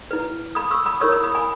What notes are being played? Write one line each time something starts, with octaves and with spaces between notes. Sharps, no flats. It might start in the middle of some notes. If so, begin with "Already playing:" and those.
E4 B4
B5 D#6
C#6 E6
B5 D#6
E4 A#4 C#5 C#6 E6
B5 D#6
B5 D#6
G#5 B5